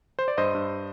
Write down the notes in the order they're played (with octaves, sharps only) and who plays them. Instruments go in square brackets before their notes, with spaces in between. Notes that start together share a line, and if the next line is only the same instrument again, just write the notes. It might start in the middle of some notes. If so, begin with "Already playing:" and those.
[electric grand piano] C5
D5
G2 C5 D#5
G2